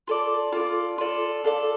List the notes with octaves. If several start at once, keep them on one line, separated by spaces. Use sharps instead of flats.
F4 A4 D5
F4 A4 D5
F4 A4 D5
F4 A4 D5